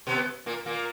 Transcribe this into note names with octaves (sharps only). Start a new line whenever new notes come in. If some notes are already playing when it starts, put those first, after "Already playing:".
B2 B3
A#2 A#3
A#2 A#3